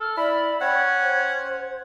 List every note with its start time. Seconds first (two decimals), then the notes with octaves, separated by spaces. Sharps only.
0.01 A4 F6
0.17 E4 D5 B5
0.61 C#4 F#5 G5 G#6
1.02 C5